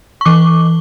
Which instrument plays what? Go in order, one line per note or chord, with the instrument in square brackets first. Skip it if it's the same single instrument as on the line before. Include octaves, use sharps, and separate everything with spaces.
[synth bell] C#6
E3 D6